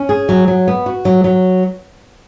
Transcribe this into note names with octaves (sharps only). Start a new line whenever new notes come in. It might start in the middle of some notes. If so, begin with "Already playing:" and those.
Already playing: C#4
G#4
F#3
F#3
B3
F#4
F#3
F#3